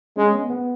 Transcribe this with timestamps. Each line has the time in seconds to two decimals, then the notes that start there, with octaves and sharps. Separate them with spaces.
0.17 G#3 C#4
0.34 B3
0.50 B3